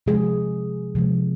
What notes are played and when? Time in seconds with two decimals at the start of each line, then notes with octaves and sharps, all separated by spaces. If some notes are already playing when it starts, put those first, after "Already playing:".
0.06 C3 F3 G#3 G#4
0.95 C3 F3 G#3